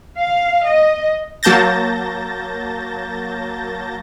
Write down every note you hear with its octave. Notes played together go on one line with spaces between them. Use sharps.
F5
D#5
F#3 A#3 A5 G6 A6 A#6